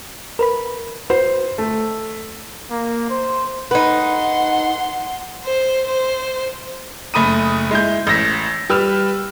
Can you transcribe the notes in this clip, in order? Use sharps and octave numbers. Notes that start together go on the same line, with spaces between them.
A#4 B4 B5
F#4 B4 C5
A3
A#3
C5
D#4 B4 F#5 C6
C5
C5
F#1 A3 B5 D#6 D#7
G#3 E4 G6
A1 E6 A#6 B6
G3 G4 B4 E6 F6